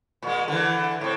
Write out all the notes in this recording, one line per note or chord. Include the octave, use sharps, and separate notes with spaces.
A#2 G#3
D3 E3
A2 C4